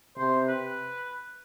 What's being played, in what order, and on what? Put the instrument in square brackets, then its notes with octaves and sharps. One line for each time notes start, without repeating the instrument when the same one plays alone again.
[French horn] C3 [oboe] C5
[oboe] B4